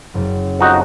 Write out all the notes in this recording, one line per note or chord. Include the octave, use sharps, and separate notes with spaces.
F#1
F2 D#4 F#4